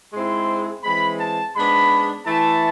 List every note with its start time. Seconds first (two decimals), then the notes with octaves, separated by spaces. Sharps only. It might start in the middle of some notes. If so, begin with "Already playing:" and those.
0.13 G#2 G#3 C4 E4 C6
0.83 E3 G#3 C4 B5
1.19 A5
1.54 G#2 G#3 B3 D4 B5
2.25 E3 A3 E4 A5